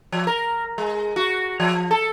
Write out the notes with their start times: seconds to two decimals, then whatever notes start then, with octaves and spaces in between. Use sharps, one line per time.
0.12 F3
0.27 A#4
0.78 G#3
1.16 F#4
1.60 F3
1.91 A4